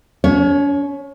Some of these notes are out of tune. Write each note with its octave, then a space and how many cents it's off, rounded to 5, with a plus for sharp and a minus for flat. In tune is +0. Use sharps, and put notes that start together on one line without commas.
C#4 +40 C#5 +0